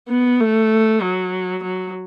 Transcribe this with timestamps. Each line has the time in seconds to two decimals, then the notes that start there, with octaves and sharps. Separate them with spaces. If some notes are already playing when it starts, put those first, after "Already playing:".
0.09 B3
0.40 A3
1.02 F#3
1.63 F#3